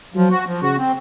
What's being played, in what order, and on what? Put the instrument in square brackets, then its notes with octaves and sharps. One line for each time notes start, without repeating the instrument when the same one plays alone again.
[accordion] F3 [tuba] F#3
[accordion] F#4
F3
[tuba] C#3 [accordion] F#4
[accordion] C4